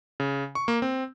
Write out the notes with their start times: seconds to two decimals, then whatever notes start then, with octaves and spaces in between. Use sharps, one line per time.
0.20 C#3
0.55 C#6
0.68 A#3
0.82 C4